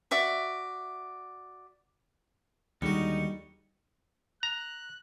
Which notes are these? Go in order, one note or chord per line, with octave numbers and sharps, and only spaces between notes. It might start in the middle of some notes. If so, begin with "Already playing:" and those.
F#4 D5 E5 C#6
D#2 D3 G3 G#3 D#4 F#4 C#7
A#5 F#6